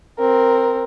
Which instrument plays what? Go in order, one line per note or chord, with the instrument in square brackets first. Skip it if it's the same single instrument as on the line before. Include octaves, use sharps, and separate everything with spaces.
[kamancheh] C4 A#4